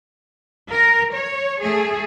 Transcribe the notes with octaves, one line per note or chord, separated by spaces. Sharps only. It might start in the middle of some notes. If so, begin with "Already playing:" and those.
A#4
C#5
A3 G#4